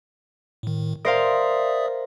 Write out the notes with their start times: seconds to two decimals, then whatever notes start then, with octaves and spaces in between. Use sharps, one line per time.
0.63 A2 D#3
1.05 A#4 C5 D5 E5 F5 D#6